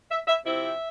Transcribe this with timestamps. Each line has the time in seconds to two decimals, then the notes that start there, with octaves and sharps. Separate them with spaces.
0.11 E5
0.28 E5
0.46 C3 F3 C4 E4 E5